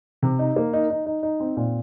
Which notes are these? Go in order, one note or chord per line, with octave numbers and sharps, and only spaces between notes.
C3
D#4
A#3
D#4
D#4
D#4
D#4
C4
A#2